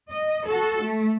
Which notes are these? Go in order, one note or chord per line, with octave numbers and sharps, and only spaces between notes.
D#5
F#4 A4
A3